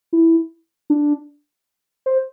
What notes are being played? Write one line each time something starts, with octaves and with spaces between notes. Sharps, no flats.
E4
D4
C5